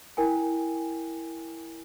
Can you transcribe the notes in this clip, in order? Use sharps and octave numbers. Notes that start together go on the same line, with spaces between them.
E4 A#4 G5 G#5